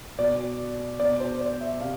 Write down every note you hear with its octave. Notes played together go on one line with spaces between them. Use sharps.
B2 D5
B2 D5
C5
D5
E5
C3 F5